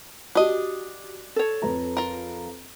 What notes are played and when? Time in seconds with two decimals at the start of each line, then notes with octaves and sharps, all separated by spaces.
0.35 D4 F#4 G4 D#5
1.36 A4 C#5
1.62 F2 B4 A#5
1.97 F4 A#4